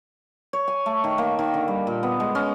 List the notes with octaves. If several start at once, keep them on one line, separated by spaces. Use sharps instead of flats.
C#5
G#5
A3
D#3
A#3
D#3
D3
G3
A#2
B3
G#3
C#4